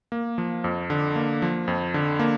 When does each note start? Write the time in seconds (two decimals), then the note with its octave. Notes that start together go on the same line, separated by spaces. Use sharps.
0.12 A#3
0.38 F3
0.64 F2
0.90 D3
1.16 A#3
1.42 F3
1.68 F2
1.94 D3
2.19 A#3